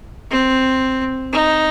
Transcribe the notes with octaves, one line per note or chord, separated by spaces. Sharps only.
C4
D#4